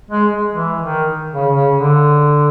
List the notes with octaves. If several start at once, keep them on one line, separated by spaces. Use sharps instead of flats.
G#3
G#3
E3
D#3
C#3
C#3
D3